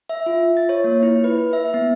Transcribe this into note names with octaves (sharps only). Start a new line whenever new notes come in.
E5
F4
A6
C#5
A#3
E4
B4
E5
B3